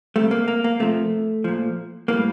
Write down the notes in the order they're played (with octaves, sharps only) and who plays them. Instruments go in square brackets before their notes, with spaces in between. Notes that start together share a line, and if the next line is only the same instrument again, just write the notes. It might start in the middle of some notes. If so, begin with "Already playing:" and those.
[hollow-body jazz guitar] C3 G3 A3
A#3
A#3
A#3
C3 F3 A3
A#2 F3
A2 G3 A#3